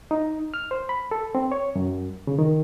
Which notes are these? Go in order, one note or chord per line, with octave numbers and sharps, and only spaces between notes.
D#4
F6
C5
B5
A4
C4
C#5
F#2
C#3
D#3